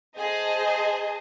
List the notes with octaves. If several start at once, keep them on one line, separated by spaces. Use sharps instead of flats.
G#4 C5 D#5 A5